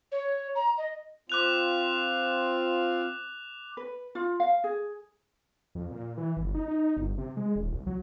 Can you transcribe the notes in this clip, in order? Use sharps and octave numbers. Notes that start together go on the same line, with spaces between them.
C#5
A#5
D#5
C4 F4 D6 F#6 F7
B4
F4
F5
G#4
F2
A#2
E3
G1
D#4
D#4
G1
C3
G#3
D#1
C2
F#3